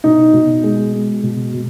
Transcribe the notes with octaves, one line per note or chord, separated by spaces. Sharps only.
B2 D#4
B2
G#3
G#3
B2
B2